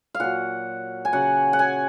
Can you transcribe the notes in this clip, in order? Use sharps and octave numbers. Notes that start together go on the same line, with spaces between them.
F5
A#2 F#3 F#5
G#5
C#3 F#3 F#5
F#5
G#5